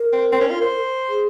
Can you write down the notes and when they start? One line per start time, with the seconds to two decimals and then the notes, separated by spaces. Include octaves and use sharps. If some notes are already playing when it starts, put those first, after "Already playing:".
Already playing: A#4
0.13 C4
0.32 C4
0.41 C#4
0.51 F4
0.61 C5
1.09 G#4